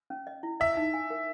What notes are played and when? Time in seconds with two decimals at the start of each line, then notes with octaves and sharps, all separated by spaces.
0.10 C#4
0.27 D#5
0.43 E4
0.60 D#5 E5
0.77 D#4
0.94 G#5
1.10 A#4